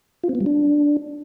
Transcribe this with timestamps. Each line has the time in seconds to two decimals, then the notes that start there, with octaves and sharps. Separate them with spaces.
0.24 F4
0.29 C4
0.35 B3
0.41 G3
0.46 D4